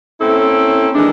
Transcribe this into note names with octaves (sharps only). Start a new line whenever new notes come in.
A#3 C4 C#4 E4 A4
D#3 E3 G#3 D4